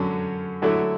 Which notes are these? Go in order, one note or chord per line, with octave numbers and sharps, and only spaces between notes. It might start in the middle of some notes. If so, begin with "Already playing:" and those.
Already playing: F#2 D3 F#3 C#4
D3 F#3 A3 E4